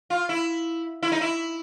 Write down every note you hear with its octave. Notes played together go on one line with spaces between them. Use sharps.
F4
E4
E4
D#4
E4